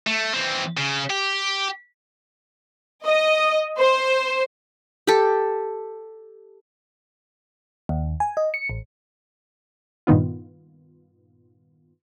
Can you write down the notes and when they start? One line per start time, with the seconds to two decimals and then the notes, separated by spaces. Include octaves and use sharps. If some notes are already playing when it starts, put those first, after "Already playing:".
0.07 A3
0.34 E3 C4
0.77 C#3
1.10 G4
3.05 D#5
3.78 C5
5.07 G4 A4
7.89 D#2
8.20 G#5
8.37 D#5
8.54 C#7
8.70 A1
10.07 G2 A#2 D#3 B3 F4